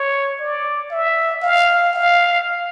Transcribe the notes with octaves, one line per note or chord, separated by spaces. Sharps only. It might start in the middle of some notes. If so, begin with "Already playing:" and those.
Already playing: C#5
D5
E5
F5
F5